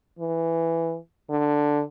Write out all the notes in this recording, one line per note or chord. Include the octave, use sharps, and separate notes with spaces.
E3
D3